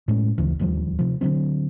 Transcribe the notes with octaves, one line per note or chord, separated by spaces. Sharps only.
A2 G#3 C#4
F1 D2 C#3 E3
D1 D#2 F3 G3
C3 F3
D3 F3 F#3 C4